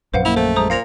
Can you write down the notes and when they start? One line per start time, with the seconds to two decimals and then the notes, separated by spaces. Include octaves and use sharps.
0.14 A#1 F#2 B4 C5 F5 F#5
0.25 A#3 E4 F7
0.36 A3 C5
0.56 G#3 C5 A#5 D#6
0.70 A#2 C5 F5 A#6 F7